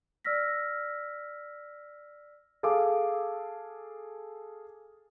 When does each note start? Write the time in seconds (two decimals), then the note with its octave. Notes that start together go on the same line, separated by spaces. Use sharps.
0.25 D5 E6 F6 A#6 B6
2.63 G#4 A4 F5 D6